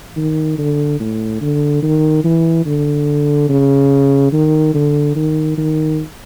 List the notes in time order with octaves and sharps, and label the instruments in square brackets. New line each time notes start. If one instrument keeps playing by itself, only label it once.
[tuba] D#3
D3
A2
D3
D#3
E3
D3
C#3
D#3
D3
D#3
D#3